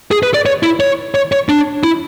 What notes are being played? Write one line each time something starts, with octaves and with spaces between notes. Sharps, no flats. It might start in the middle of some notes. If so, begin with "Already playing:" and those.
G#4
B4
D5
C#5
E4
C#5
C#5
C#5
D4
E4